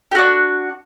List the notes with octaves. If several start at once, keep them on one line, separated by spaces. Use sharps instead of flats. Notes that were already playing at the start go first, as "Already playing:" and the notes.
D4 F#4 G4